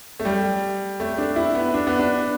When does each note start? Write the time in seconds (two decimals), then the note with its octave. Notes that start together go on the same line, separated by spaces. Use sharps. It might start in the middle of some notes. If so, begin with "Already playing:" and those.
0.20 A3
0.25 G3
1.00 A3
1.18 D4
1.36 E4
1.55 B3
1.74 D4
1.87 B3
1.99 D4